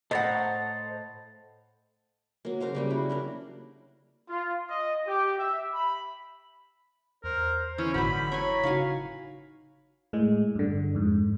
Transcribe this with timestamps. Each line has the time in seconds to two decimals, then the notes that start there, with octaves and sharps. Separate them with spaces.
0.11 A2 A4 C5 D#5 F#5 A#5 A6
2.45 F#3 A#3
2.60 C#3 A#4 C5 F5
2.75 C#3 G3 A#3
2.90 E4 F#4
3.09 F#3 D4 A#4
4.29 F4
4.69 D#5
5.08 G4
5.38 E5
5.74 B5
7.24 E2 A#4 C5
7.78 E3 C#4
7.94 G1 A2 D3 F#3 E4 B5 G6
8.32 A#4 B4 C#5 G#5
8.64 C#3 D#4 F#4 F5 G#5
10.13 A2 G#3
10.55 G2 D3
10.95 F2 G#2